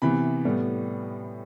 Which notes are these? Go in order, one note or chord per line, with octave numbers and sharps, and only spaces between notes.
C3 E3 B3 B5
A2 G3 B3